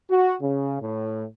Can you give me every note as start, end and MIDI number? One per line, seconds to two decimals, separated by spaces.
0.10 0.35 66
0.42 0.80 49
0.82 1.25 45